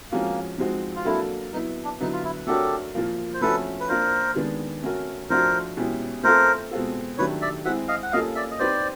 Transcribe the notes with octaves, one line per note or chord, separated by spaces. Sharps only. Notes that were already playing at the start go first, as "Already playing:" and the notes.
F3 G#3 A#3 C#4 F#4
F3 G#3 C4 D#4 F#4
F4
F#3 A#3 D4 E4 F#4 A4
F#3 B3 D#4 E4
D4
D3 F#3 B3 D#4 E4
F4
E4
A3 D4 F#4 G4 A4 A#4 C#5
A#2 F3 A#3
C5
F3 A3 C#4 F#4 A4 B4
B4
A#3 D4 F4 A#4 C5
D#3 G#3 B3 D4
A3 C#4 F#4 A#4
F3 A3 D4 F#4 A#4 C5
B2 G#3 C#4 E4 G4
A3 C4 F4 A4 A#4 C5
B2 G#3 C4 F4 A4
D#3 F#3 A3 D4 G4 B4 C#5
D5 E5
G#3 C4 E4 G#4 E5 F#5
D#5 F5
F#5
G3 A#3 C#4 F4 A4 D#5 F5
D5 E5
D#5
G3 C4 D#4 G4 B4 C5 D5